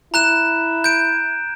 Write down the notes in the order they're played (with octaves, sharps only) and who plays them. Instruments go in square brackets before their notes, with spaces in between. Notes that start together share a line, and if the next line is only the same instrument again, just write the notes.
[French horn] E4 [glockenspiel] A#5 F#6 E7
[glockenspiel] G6 D7